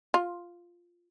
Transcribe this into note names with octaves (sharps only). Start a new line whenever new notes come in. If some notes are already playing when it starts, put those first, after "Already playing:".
F4